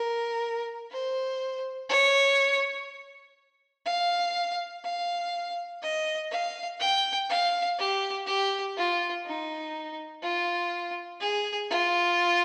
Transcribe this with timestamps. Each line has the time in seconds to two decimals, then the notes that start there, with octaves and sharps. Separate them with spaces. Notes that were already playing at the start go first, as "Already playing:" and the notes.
Already playing: A#4
0.91 C5
1.89 C#5
3.85 F5
4.84 F5
5.82 D#5
6.31 F5
6.80 G5
7.30 F5
7.78 G4
8.26 G4
8.77 F4
9.26 D#4
10.24 F4
11.21 G#4
11.70 F4